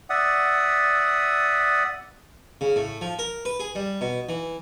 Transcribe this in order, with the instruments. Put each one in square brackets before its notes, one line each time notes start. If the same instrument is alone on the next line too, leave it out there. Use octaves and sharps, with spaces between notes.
[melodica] D5 E5 F#5 D#6
[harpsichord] C#3
A2
F3
A#4
B4
G#4
G3
B2
E3